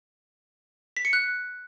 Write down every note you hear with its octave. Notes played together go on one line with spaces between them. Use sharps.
B6
C#7
F#6